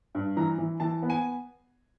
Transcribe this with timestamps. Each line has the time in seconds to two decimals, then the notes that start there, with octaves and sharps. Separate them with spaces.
0.15 G2
0.37 E3 A#5
0.58 E3
0.80 E3 A5
1.02 B3
1.10 G#5